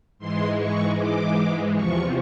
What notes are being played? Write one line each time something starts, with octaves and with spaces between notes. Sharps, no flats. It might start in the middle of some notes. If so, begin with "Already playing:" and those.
G#2 E3 G#3 C6
C#6
D6
E2 C3 F3 C#6